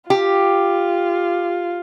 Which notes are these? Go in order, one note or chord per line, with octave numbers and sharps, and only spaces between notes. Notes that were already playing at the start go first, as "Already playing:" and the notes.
F4 G4